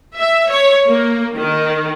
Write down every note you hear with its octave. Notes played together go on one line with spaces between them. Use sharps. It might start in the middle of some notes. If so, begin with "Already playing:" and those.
E5
C#5
A#3
D#3